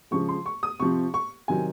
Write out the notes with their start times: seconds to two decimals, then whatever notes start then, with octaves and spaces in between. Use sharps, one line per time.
0.11 C#3 F3 G#3 C#6
0.29 C6
0.46 C#6
0.63 D#6
0.80 C3 F3 C4 C#6
1.14 C#6
1.48 C3 D#3 F#3 C4 G#5